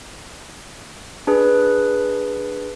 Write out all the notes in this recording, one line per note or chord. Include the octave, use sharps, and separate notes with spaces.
D4 G#4 B4